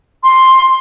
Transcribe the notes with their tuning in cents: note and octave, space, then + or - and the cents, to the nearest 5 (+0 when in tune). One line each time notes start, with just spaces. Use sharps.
C6 +10